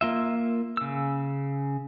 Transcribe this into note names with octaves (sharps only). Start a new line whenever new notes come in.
A#3 F4 E5
C#3 E6